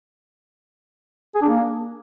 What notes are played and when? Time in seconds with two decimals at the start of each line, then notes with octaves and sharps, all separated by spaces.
1.35 G#4
1.42 D4
1.49 A#3